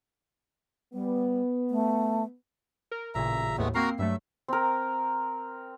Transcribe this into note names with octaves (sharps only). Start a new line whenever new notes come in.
G3 B3
A3
A#4
A1 A#2 C#3 E5 A#5
D#2 A2 G#3 A3 B3
A#3 C4 F#4 A#4 A#5 C7
G2 F#3 A3 E5
C4 A#4